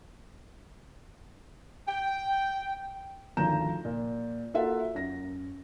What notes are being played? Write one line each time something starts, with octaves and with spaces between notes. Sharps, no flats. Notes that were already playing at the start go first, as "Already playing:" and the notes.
G5
G#1 D2 F3 A#5 G6 E7
A#2
A#3 F4 F#4 A4 E5 F#5
F#2 A#6